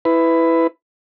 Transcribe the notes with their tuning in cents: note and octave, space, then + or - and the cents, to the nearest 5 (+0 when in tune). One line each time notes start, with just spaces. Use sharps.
E4 +0 B4 +15